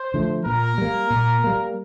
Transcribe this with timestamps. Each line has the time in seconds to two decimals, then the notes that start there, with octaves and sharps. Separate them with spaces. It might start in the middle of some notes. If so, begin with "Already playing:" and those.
Already playing: C5
0.14 D3 F3 A3
0.46 A#2 A#4
0.78 G3 A#3
1.10 A#2
1.44 G3 A#3